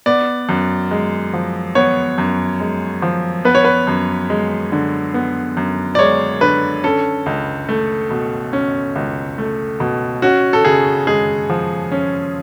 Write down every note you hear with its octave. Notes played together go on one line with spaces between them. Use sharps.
B3 D5
F#2
G#3
F3
B3 C#5
F#2
G#3
F3
B3 B4
C#5
B4
F#2
G#3
D3
B3
F#2
D5
G#3 C#5
D3 B4
C#4 A4
C#2
A3
B2
C#4
C#2
A3
B2
C#4 F#4
A4
C#3 G#4
G#3 G#4
F3
C#4